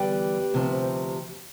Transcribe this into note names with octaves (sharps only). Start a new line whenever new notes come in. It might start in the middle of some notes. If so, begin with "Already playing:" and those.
Already playing: E2 D3 G3 G4 B4
D2 C3 F3